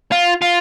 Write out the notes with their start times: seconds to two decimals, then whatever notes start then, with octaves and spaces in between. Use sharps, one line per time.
0.12 F4
0.42 F4